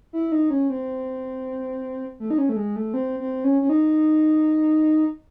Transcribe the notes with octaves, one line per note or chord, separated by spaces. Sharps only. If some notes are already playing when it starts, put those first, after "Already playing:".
E4
D#4
C#4
C4
A3
D#4
C#4
A3
G#3
A3
C4
C4
C#4
C#4
D#4